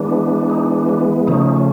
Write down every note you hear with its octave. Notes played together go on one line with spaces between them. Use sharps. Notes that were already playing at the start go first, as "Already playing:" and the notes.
Already playing: E3 G#3 B3 D4
D#4
D4
C#3 F3 A3 C#4 D#4